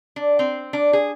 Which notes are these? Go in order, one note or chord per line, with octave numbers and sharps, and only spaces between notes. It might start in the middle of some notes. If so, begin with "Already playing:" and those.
D4
C4
D4
G#4